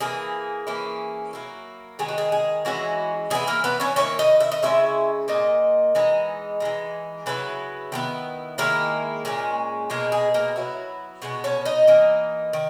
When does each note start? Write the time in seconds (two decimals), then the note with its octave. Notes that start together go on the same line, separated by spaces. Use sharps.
0.01 E3 A#3 E4 G#4
0.67 E3 A#3 C#4 E4
1.33 F#3 A#3 E4
1.99 D#3 G#3 B3 D#4 G#4
2.09 F#4
2.18 G#4
2.32 G#4
2.65 E3 G#3 C#4 E4 F#4
3.30 E3 B3 E4 G#4
3.47 A#3 A#4
3.64 B3 B4
3.80 C#4 C#5
3.96 D#3 A#3 C#4 E4 C#5
4.19 D#4 D#5
4.40 E5
4.52 D#5
4.63 C#3 G#3 C#4 E4 E5
5.28 A#2 A#3 D#4 D#5
5.95 E3 G#3 B3 D#4
6.60 E3 G#3 D#4
7.26 C#3 F#3 B3 E4 B4
7.92 D#3 G#3 B3 E4
8.58 D#3 G#3 A#3 E4 A#4
9.25 A#2 G#3 C#4
9.90 B2 G#3 A#3 D#4 A#4
10.12 G#4
10.34 A#3 A#4
10.56 F#3 B3 E4
11.22 B2 G#3 B3 F#4
11.44 C#4 C#5
11.65 D#4 D#5
11.87 E3 A#3 D#4
12.53 D#3